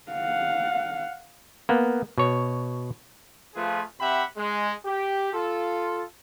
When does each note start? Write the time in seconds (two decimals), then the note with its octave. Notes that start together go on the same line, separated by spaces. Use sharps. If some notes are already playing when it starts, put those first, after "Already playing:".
0.12 F5 F#5
1.69 A#3 B3
2.18 B2 C#5
3.55 F3 A3 F4 G#4 B4
4.00 C3 C4 G4 E5 F#5 B5
4.37 G#3
4.85 G4
5.33 F4 A4